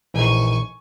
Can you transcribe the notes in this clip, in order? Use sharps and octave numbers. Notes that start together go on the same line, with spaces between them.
A#1 E3 D#4 G#5 C#6